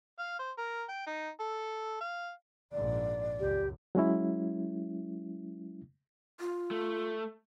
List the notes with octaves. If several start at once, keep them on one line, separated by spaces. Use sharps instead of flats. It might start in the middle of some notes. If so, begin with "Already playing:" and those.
F5
C5
A#4
G5
D#4
A4
F5
A#1 G#2 D5
C#2 F#2 G4
F#3 G#3 C#4 E4
F4
A3